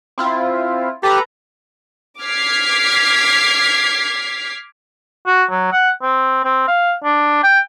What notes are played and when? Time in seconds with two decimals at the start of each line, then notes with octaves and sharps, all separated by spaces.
0.18 C4 E4 F4
1.03 G4 A4 B4 A#5
2.21 D6 F6 G#6 B6 C7
5.26 F#4
5.51 F#3
5.72 F#5
6.02 C4
6.44 C4
6.68 F5
7.04 D4
7.44 G5